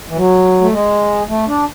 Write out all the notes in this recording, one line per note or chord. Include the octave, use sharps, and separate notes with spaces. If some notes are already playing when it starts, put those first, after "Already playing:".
E3
F#3
A3
G#3
A3
D4